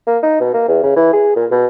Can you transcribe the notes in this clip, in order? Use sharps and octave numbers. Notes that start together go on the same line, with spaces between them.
A#3
D#4
B2
A#3
E2
C#3
E3
G#4
A#2
B2